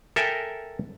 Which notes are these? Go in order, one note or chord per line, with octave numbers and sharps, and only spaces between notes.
A4 A#4 E5 G5 G#5